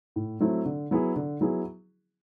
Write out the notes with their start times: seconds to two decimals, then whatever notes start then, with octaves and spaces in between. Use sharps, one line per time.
0.16 A2
0.40 F#3 A3 C4 E4
0.65 D3
0.91 F#3 B3 E4 G#4
1.16 D3
1.41 F#3 B3 E4 G#4